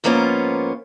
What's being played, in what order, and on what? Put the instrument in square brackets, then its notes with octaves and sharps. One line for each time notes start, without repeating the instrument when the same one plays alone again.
[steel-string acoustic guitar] G#2 F3 A#3 B3 C#4 F4